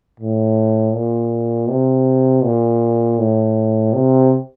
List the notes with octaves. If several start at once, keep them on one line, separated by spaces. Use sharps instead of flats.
A2
A#2
C3
A#2
A2
C3